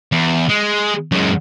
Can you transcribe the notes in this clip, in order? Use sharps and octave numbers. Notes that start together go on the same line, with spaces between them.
E2
G#3
F#2 G#3